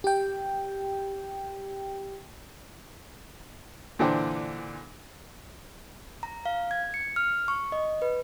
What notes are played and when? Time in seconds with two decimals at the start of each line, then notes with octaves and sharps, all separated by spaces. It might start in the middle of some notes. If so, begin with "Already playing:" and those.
0.04 G4 G5
3.99 A#2 D3 E3 D4 C5 G5
6.23 A#5
6.46 F5
6.71 G#6
6.94 C#7
7.16 F6
7.48 C#6
7.72 D#5
8.02 B4